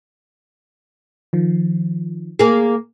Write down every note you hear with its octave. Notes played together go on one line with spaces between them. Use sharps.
D#3 F3
A#3 G#4